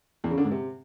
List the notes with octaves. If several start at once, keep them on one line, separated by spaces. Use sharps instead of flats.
E2
C#3
D3
G#2
C3